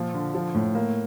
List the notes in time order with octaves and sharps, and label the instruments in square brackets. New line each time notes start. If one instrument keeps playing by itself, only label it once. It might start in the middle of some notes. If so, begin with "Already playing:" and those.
Already playing: [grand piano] A#2 F3
D3
F3
A2
A#3